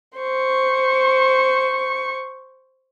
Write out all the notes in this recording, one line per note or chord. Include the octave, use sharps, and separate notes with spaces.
C5 C#6